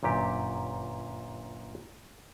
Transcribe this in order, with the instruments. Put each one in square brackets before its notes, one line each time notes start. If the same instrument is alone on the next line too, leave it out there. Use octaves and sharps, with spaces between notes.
[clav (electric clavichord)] G1 F#2 A#2 G4